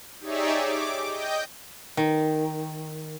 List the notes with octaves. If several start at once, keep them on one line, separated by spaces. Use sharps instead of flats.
D#4 G4 G#4 C#5 D5 E5
D6
D#5 G5 G6
D#3